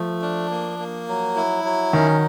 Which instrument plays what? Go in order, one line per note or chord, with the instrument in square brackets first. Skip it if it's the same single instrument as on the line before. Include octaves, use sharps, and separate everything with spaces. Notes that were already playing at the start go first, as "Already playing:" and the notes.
Already playing: [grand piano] F3 [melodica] A3
[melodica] D4
A#3
A#3
F#3
E4
F#3
[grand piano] D#3 [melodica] C#4